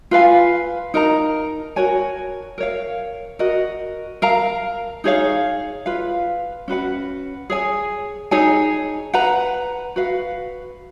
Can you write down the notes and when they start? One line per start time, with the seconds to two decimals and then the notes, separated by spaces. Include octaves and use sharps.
0.11 F4 B4 F5 G#5
0.94 D#4 A#4 D#5 A#5
1.76 F#4 A#4 C#5 G#5
2.58 A#4 C#5 F5
3.39 F#4 A#4 D#5
4.22 A#4 F5 A#5
5.04 D#4 G#4 C#5 F5
5.86 F4 B4 F5
6.68 C#4 F#4 B4 F#5
7.50 G#4 C#5 G#5
8.31 D#4 G#4 C#5 G#5
9.14 B4 F#5 A#5
9.96 F#4 B4 F5